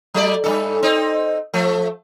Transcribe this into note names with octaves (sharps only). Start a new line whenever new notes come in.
F#3 A3 D5
G2 B2 A4
C4 D#4
F3 A3